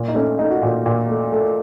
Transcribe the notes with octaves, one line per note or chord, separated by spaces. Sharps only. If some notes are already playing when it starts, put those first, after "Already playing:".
Already playing: A#2
D#4
A3 C#4
A3 D#4
F#4
A#2 F4
A#2
A3
A3